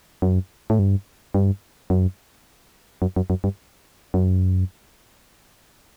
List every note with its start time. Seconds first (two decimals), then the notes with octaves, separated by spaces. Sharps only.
0.22 F#2
0.70 A2
0.79 G2
1.34 G2
1.90 F#2
3.02 F#2
3.16 F#2
3.30 F#2
3.44 G2
4.14 F#2